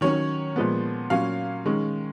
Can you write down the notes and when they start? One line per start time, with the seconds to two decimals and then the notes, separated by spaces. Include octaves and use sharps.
0.01 D#3 F#3 C#4 C#5
0.56 A#2 F3 G#3 B3
1.10 A#2 F#3 C#4 F5
1.65 D#3 G#3 C#4